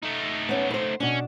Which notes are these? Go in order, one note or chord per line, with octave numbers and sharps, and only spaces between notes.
A3 D#4
B3 C#4
B4 C5
B2 C#4 D4